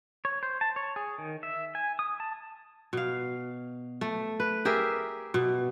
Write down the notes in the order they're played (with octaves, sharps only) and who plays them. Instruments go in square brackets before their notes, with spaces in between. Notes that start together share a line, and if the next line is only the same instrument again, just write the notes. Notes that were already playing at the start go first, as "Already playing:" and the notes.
[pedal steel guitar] C#5
C5
A5
C#5
G#4
D#3
E5
G#5
D#6
A5
[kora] B2 F5
A3
B4
G4 G#4 A#4 E5
B2